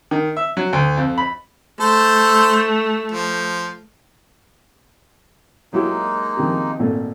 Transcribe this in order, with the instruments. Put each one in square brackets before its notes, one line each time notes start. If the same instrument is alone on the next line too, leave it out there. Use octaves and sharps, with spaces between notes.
[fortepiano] D#3
E5
F#3
D2
F2
B5
[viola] A3 [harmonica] A4 C5 A5
[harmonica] F3
[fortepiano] F#3 E4 G4 [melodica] G#3 A#3 D#4
[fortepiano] C3 D#3 F3
G#1 A#2 A3